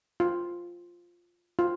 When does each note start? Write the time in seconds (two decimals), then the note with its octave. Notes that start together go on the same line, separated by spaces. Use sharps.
0.20 F4
1.59 F4